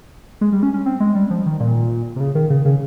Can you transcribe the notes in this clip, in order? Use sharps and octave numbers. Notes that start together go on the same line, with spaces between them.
G#3
G3
C#4
C#4
C4
G#3
G3
F3
D#3
A#2
C3
C#3
D#3
C#3
C#3